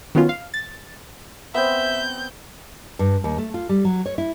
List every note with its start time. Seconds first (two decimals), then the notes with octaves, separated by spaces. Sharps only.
0.15 D#3 F#3 B3 C#4 F4
0.29 F5
0.54 A6
1.54 B3 C4 E5 G6
2.99 G2
3.24 D#2
3.38 A3
3.54 F4
3.69 G3
3.85 F#3
4.06 C#5
4.18 E4